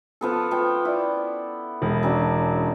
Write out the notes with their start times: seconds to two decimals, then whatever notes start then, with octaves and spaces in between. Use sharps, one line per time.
0.21 F3 B3 A4
0.51 F3 G5 C#6
0.85 E4 D5
1.82 E1
2.03 F#3 C#4 D4